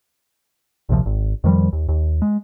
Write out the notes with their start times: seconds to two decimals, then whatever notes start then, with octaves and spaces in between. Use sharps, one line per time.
0.89 A#1 D#2 C3 F3
1.06 G#1
1.44 F2 D#3 F3 G3
1.73 D#2
1.89 D#2
2.22 G#3